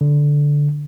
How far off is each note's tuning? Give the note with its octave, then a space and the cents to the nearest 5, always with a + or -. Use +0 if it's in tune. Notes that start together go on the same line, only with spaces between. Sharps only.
D3 -10